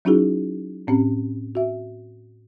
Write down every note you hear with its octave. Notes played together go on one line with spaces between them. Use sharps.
F#3 C#4 D#4 E4 F#4 G#4
A2 C4 C#4 G4
F#4 E5